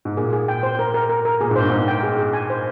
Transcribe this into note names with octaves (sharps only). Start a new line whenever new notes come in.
G#2
A#2 G#4
G#4
G5
C5
A#4
A#4
A#4
A#4
A#2 G#4
G#2
G2 C5
G#2 D#4
G5
G#4
G#4
G#5
C5